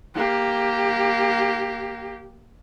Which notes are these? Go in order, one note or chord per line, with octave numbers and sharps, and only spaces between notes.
A#3 G4